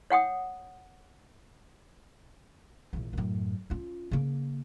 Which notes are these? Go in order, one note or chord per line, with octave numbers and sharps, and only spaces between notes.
C#5 F#5 G5 D#6
A#1 E2
F#2 A2
C#4 F4
C#3 A#3